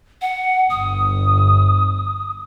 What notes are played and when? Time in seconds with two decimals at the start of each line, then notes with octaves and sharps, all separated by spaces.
0.21 F#5
0.70 G1 D#6